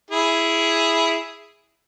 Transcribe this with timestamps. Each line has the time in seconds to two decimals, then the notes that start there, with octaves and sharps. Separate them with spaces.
0.11 E4 G#4